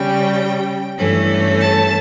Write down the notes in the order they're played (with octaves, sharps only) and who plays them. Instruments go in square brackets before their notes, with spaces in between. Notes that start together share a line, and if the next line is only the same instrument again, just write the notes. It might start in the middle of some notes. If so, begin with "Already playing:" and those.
Already playing: [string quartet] C#3 G3 C#4 G5
G2 E3 A3 C#4
A5